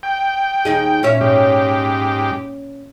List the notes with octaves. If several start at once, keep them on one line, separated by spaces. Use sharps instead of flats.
G5
D#2 D#4 G#4
A#2 C#4 E5
G#2 G4